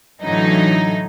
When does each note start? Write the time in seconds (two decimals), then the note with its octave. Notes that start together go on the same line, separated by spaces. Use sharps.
0.23 A2 D3 E3 F#3 D#4